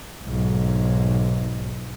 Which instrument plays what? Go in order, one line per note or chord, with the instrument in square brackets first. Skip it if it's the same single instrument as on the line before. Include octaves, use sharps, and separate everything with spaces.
[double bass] B1 G#2